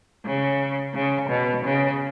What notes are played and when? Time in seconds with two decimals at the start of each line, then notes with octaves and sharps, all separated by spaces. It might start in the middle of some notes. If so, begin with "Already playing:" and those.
0.25 C#3
0.94 C#3
1.29 B2
1.65 C#3